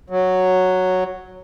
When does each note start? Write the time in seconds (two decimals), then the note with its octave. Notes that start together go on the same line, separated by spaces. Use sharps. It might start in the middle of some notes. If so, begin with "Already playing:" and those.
0.10 F#3